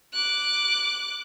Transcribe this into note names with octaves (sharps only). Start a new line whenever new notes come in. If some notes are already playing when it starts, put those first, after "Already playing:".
D6 F#6